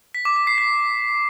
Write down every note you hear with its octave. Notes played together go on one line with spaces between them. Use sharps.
B6
D6
D6
C7
B6